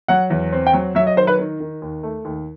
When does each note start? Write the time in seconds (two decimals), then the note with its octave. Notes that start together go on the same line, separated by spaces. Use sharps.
0.08 F#3 F#5
0.30 E2
0.52 C4
0.67 G5
0.73 F#3
0.95 F#3 E5
1.07 D#5
1.16 D#3 C5
1.27 B4
1.39 D#3
1.60 D#3
1.82 D#2
2.03 A3
2.25 D#2